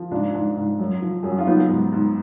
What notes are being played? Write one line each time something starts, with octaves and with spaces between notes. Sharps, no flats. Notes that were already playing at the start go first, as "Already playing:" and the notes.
Already playing: F3
G#2 D4 F4
G#2
G#2
F#2
F3
F#2 G#4
F#4
F4
F#3 B3 D#4
G#2
G#2